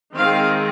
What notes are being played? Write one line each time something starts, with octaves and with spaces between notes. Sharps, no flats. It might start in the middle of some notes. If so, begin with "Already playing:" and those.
D#3 G#3 C4 F5